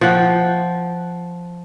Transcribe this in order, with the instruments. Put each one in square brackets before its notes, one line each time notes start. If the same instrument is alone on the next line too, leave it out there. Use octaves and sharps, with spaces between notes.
[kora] F3 F#5 G5